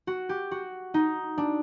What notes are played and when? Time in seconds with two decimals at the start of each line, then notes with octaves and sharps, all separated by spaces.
0.07 F#4
0.29 G4
0.51 F#4
0.94 D#4
1.38 D4